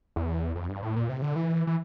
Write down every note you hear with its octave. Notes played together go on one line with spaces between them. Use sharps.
E2
F2
G2
A2
A#2
C3
D3
E3
E3